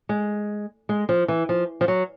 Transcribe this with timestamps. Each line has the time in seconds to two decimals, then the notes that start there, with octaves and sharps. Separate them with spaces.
0.09 G#3
0.89 G#3
1.09 F3
1.28 E3
1.49 F3
1.81 F3
1.88 F#3